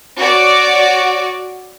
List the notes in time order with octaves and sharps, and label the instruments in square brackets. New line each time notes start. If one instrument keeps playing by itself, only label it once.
[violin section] F#4 C#5 D5